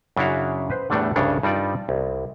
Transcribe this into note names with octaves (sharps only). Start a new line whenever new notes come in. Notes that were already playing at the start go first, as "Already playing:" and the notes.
F#2 C#3 D4 E4 F#4 F5
B4 C5
E2 A2 G3 A3 D4 F#5
C2 G2 C#3 D4 C#5
G2 G3 D#4 F4 D5
C2